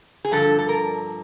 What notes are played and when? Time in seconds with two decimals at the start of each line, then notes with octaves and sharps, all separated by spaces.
0.25 G#4
0.32 G2 D3 F3 A4
0.59 A4
0.69 A#4